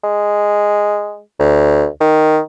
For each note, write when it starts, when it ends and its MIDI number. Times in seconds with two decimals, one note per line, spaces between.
0.04 1.20 56
1.40 1.86 38
2.00 2.39 51